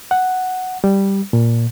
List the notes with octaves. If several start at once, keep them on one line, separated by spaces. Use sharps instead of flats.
F#5
G3
A#2